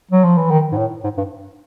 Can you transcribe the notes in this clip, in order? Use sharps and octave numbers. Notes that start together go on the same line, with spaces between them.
F#3
F3
E3
D#3
G#2
A2
G#2
G2